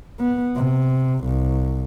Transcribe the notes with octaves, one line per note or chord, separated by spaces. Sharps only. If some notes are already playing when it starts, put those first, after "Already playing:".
B3
C3
C2